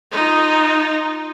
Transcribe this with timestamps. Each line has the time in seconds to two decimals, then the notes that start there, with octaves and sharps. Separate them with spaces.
0.11 D#4 F4